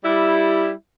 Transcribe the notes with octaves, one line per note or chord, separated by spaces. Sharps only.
G3 E4